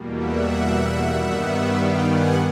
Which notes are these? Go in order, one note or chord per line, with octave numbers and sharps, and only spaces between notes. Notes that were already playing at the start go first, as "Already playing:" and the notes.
Already playing: E2 B2 G3 A#3
E5 F#5
G2 D#3 G3 B3
F5 G5
F#5 G#5